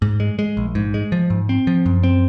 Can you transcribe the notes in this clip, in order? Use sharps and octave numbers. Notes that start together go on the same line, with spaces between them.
G#2
G#3
G#3
A#1
G#2
G#3
F3
G#2
C4
F3
F#2
C4